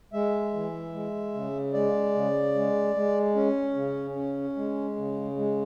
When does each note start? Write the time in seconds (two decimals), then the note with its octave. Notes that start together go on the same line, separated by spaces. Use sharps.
0.13 G#3 E5
0.53 E3
0.93 G#3
1.34 C#3
1.73 G#3 D5
2.14 C#3
2.55 G#3
2.95 G#3
3.35 C#4
3.75 C#3
4.16 C#4
4.56 G#3
4.96 C#3
5.36 G#3